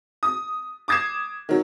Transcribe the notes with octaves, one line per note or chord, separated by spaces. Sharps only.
D#6
D6 D#6 G#6 C7 E7
D#3 F#3